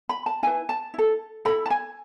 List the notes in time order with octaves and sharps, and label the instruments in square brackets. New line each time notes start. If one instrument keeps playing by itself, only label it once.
[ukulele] B5
A5
E4 B4 G#5
A5
E4 A4
E4 A4 B5
A5
G#5